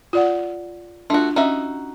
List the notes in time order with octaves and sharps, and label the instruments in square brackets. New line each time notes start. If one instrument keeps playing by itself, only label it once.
[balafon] F4 D5 F#5
[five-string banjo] A3 F#4 [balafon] D4 F4
[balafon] C#4 [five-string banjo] D#4 F#4 E5